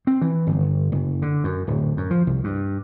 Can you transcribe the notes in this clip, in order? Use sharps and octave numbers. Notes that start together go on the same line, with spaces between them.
C4
E3
G1
F#1
D3
F#2
D1
F#2
F3
C2
G2